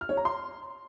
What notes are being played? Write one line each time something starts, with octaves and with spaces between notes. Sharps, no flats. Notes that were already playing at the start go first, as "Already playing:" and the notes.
F6
C#5
A#5
C6